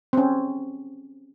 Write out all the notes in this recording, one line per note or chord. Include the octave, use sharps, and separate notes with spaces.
C4 C#4